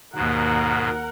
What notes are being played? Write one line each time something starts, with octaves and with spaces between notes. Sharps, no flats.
D#2 G#2 B2 A#4 F#5